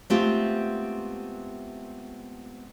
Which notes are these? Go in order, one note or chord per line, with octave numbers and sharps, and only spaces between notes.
G#3 A3 B3 C4 F4 G4